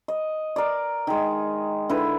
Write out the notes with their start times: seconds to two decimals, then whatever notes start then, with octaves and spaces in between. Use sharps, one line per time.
0.08 D#5
0.56 A#4 D5
1.07 D#3 G#3
1.89 D3 E4 B4